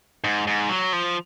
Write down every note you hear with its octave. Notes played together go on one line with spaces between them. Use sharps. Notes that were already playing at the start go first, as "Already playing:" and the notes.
G#2
G#2
F#3
F3